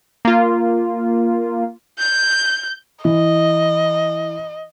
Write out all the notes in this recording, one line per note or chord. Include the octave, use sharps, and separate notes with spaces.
A#3 F4
G6
E3 D#5